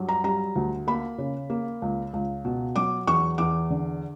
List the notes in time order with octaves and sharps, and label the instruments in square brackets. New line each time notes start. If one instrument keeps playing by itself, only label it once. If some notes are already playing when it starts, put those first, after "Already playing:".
Already playing: [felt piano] G2 F#3
A#5
G3 A#5
D2
A#3 B5
C#3
A#3
C#2
C#2
B2
F#3 D6
E2 C#6
E2 D6
D3